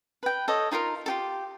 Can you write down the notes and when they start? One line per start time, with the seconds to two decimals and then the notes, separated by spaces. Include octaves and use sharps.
0.23 B4 G5
0.48 A4 C#5 D#5
0.71 D#4 F4 G4 A#4
1.06 F4 G4 A4